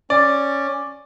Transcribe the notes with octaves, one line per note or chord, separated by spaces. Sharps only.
C#4 D5